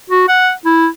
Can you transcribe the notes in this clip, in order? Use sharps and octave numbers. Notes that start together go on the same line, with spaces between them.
F#4
F#5
E4